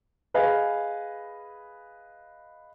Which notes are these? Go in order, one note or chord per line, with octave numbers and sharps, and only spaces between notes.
G#4 B4 D#5 F5 G#5